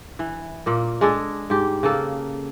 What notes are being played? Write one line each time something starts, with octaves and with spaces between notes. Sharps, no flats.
E3
A#2 A#3
G#3 D4 G#4 A4
G#2 G4
C#3 A#3 A4